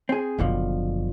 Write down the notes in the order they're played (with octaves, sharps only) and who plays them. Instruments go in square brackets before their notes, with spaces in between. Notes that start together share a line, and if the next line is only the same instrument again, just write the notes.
[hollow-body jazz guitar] C4 G#4
[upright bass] F#1 F#2 [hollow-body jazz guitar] B2 D3 F3